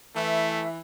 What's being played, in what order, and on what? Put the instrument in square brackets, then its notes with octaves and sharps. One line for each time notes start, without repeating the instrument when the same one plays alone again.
[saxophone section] E3 [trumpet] A3 [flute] E5